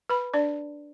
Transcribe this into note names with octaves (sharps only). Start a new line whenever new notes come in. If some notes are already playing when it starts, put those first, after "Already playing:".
B4 B5
D4 D5